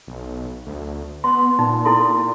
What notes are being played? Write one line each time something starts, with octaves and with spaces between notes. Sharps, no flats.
B1
D2
B3 C6
A#2 D#4
E4 A4 C6